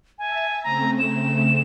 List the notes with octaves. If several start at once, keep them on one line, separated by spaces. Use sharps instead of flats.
E5 G#5 A5
C#3 A3 C4 A#5
E7